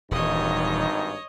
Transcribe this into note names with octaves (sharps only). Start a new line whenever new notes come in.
D#1 G#1 G2 E3 D#4 C#5 D#5